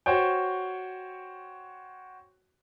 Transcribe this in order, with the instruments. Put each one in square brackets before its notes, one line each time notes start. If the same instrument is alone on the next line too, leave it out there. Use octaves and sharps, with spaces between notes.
[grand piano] F#4 C5 C#5 G5